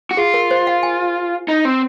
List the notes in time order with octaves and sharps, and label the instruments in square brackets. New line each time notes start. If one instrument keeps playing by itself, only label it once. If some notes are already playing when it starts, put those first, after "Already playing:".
[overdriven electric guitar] F#4
[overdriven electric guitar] F4 [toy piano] G#4
[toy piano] A#4
C5
F5
G#5
[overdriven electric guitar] D#4
C4